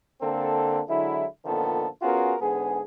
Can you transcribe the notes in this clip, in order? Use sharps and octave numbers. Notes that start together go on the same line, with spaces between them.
D3 A#3 C4 A4
D3 F#3 G#3 E4
A#2 D3 D#3 F3 B3 A4
B3 C#4 F4 F#4 G#4 A#4
G#2 D3 B3 G#4